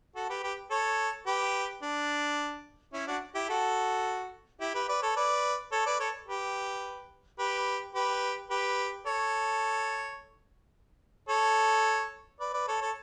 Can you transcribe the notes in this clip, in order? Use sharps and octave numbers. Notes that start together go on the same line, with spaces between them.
F#4 A4
G4 B4
G4 B4
A4 C#5
G4 B4
D4
C#4 E4
D4 F#4
E4 G4
F#4 A4
E4 G4
G4 B4
B4 D5
A4 C#5
B4 D5
A4 C#5
B4 D5
A4 C#5
G4 B4
G4 B4
G4 B4
G4 B4
A4 C#5
A4 C#5
B4 D5
B4 D5
A4 C#5
A4 C#5